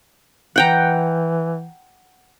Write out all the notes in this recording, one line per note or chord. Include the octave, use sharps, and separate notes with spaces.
E3 F#5 G5 A#5